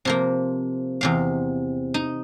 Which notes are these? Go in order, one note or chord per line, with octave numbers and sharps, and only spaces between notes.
C3 F3 A#3
E2 C3 F5
D#4